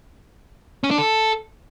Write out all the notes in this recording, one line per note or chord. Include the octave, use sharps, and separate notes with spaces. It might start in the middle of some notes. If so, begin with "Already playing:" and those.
C#4
D4
A4